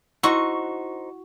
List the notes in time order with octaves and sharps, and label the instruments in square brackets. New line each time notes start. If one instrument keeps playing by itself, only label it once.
[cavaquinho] D#4 C5 C#6 [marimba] E4 [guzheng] F#4